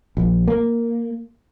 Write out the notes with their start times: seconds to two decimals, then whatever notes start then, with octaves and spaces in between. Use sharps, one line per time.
0.17 A#1
0.48 A#3